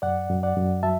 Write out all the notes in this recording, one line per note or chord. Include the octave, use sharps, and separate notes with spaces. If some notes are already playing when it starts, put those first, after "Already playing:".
F#2 D5 F#5
F#2
D5 F#5
F#2
F#3 E5 A5